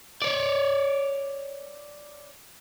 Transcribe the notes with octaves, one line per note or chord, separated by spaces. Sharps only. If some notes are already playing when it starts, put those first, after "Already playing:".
C#5 D5